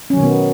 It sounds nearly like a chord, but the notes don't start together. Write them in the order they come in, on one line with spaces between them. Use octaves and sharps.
C#4 F#3 D#3 B2 B3